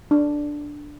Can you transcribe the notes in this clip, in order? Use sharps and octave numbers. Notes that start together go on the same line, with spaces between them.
D4